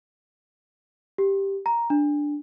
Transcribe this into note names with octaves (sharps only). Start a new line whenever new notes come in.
G4
A#5
D4